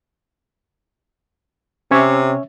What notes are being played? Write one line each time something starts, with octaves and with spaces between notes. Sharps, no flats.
C3 C#4 C#5 E5